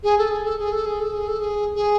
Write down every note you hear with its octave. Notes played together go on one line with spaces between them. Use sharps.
G#4
A4
G#4
A4
G#4
A4
G#4
A4
G#4
A4
G#4
G#4